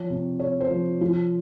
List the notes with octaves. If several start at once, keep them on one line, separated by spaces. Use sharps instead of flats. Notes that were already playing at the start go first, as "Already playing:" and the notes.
Already playing: F3 C#5
C3
C3 C#5
C5
F3
F3 F4